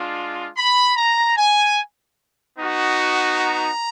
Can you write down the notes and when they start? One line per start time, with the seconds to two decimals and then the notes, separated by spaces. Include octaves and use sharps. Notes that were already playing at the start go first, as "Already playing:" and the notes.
Already playing: G#3 D4 F4
0.56 B5
0.96 A#5
1.36 G#5
2.57 B3 D#4 F#4
3.38 A#5